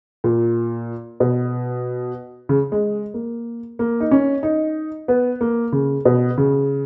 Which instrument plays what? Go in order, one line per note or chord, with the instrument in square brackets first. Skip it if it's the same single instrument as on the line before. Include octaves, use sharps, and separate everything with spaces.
[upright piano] A#2
B2
C#3
G#3
A#3
A#3
D#4
C#4
D#4
B3
A#3
C#3
B2
C#3